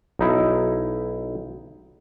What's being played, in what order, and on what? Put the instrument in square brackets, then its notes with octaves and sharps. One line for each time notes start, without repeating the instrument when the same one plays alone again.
[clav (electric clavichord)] B1 D#4 E4